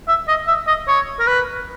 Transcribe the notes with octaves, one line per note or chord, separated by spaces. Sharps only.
E5
D#5
E5
D#5
C#5
A#4
B4